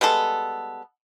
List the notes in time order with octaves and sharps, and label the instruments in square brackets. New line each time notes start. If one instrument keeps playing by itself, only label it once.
[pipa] G3 G#3 B3 A4